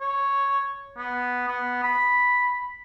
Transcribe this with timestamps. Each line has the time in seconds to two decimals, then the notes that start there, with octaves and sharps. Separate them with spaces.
0.01 C#5
0.97 B3
1.47 B3
1.83 B5